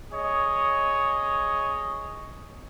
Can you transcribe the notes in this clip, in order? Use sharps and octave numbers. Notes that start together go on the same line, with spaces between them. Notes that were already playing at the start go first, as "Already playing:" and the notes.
G#4 C#5 D#5